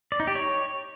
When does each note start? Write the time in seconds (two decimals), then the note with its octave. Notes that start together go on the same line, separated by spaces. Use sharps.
0.12 D5
0.20 D#4
0.27 G4
0.35 C#5